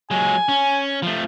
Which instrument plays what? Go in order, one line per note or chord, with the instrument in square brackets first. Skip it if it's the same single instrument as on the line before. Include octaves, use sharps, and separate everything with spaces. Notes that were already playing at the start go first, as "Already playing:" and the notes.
[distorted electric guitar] F#3 G#3 [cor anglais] G#5
[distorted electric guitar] C#4
F3 A3